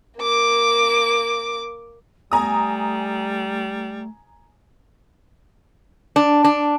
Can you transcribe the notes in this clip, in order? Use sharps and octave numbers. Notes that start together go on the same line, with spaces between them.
A#3 D6
G3 A3 G#5 A#5 D#6
D4
D4